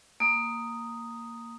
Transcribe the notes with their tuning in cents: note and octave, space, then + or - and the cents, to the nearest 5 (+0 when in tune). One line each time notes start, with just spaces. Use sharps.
A#3 -10 D#6 +0